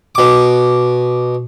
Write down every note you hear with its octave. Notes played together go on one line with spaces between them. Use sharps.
B2 D6